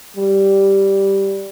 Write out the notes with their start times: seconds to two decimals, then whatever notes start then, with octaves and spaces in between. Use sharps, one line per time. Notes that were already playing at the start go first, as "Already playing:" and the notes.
0.17 G3